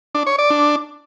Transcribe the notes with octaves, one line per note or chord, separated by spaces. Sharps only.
D4
C#5
D5
D4